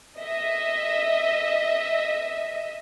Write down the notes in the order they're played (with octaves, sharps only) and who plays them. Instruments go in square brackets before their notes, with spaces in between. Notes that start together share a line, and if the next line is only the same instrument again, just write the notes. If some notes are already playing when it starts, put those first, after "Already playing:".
[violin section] D#5 E5